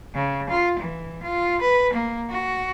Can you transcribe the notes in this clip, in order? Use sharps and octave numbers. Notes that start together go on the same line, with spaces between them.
C#3
F4
E3
F4
B4
A#3
F#4